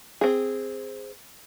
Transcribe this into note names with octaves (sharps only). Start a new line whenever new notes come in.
C4 G#4